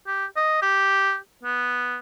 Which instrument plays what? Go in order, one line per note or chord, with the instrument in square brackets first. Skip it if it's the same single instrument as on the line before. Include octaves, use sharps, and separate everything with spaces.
[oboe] G4
D#5
G4
B3